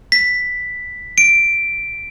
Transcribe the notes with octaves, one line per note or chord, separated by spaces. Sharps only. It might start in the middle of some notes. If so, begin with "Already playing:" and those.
B6
D7